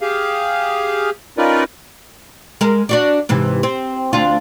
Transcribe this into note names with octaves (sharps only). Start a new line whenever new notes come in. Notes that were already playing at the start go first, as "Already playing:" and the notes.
G4 G#4 F5
C#4 D#4 F4 A#4 B4 D5
G#3 A#4
D4 F#4 D5
G#2 C3 E3
C4
D2 D4 F4